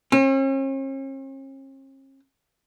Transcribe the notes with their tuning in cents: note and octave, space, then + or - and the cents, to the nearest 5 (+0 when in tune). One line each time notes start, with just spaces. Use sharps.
C#4 -45